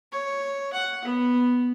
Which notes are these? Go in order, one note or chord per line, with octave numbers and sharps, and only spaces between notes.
C#5
F#5
B3